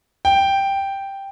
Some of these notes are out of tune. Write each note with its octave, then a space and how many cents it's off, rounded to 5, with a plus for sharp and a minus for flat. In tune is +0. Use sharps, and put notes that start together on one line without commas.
G5 +0